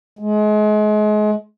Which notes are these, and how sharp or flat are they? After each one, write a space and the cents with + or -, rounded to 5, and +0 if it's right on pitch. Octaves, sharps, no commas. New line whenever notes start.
G#3 +35